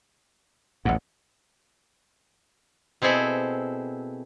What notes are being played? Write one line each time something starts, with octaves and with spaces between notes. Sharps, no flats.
A1 E2 G#2 F#5
B2 C4 E4 G#4 A4